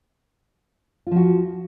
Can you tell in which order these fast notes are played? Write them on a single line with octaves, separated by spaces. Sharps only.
F4 F3 F#4